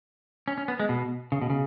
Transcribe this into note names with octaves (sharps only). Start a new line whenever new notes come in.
C#4
C#4
B3
G#3
B2
C#3
B2
C#3